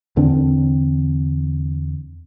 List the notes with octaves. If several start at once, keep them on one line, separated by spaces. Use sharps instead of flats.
E2 D3 C4 D4